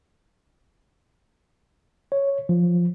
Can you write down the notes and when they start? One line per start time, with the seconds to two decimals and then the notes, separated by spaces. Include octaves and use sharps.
2.12 C#5
2.49 F3